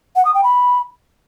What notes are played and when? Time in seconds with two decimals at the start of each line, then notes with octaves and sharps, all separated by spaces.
0.16 F#5
0.25 D#6
0.34 G5
0.44 B5